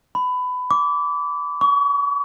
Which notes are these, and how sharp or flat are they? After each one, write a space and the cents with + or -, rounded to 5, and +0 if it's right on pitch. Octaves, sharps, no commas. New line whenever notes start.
B5 +20
D6 -25
C#6 +40